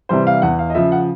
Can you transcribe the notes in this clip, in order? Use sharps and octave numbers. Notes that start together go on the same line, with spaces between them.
C3 E3 G3 C5
F5
E2 F#5
F5
D#5
C#3 F3 E5
F#5